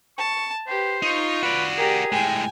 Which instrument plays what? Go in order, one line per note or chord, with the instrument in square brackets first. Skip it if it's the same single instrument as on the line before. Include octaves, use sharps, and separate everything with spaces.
[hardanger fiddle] A5 [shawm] C#6
[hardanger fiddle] G4 B4 [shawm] C5
[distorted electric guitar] D#4 [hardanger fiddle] F4 C#6
[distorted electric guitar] F#4 D5 [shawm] B4
[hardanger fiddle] G4 A#4 [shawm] G#4
[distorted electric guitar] A2 G#3 [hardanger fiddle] G5 G#5